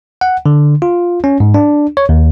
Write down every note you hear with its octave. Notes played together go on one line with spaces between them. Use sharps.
F#5
D3
F4
C#4
G#2
D4
C#5
D#2